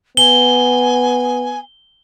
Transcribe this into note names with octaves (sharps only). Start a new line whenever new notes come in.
B3 G#5 G7